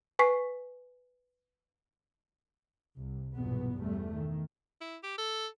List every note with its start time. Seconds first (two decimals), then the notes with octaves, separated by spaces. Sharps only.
0.19 B4 G#5 C#6 B6 C7
2.96 C2
3.35 B1 E2 G2 A#2 B3
3.80 E2 G3 A3
4.13 D#3
4.81 E4
5.03 G4
5.18 A4